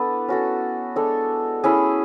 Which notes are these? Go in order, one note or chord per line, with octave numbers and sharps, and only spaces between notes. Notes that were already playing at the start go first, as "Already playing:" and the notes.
Already playing: B3 D4 E4 A4 B4
C#4 F#4 A4
G#3 D4 A4 C#5
C#4 E4 G#4